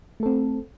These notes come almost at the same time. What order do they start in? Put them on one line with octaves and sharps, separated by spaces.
A3 A4 C4